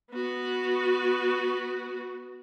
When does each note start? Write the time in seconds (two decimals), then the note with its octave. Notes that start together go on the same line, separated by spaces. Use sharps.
0.12 B3 F#4